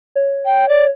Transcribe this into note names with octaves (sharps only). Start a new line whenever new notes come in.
C#5
G5
D5